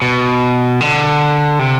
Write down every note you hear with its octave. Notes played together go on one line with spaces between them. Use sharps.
B2
D3
C3